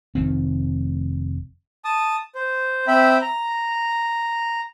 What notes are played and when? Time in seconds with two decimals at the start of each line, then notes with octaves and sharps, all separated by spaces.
0.15 F1 D#3 C4
1.85 A5 D#6
2.35 C5
2.87 C4 E5 G5 B5
3.22 A#5